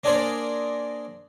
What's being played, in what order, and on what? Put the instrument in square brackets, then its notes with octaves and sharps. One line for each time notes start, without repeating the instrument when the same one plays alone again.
[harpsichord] A#3 D4 G#4 A#4 C5 D5